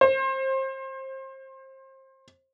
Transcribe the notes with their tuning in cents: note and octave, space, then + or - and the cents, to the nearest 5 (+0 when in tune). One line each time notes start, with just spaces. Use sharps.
C5 +25